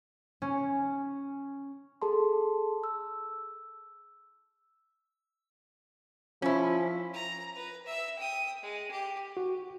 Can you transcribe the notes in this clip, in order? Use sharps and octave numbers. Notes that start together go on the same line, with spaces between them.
C#4
G#4 A4 A5 C6
E6
F3 C#4 E4
A#5
B4 A#5
E5 E6
G5 D#6
G#3
G4
F#4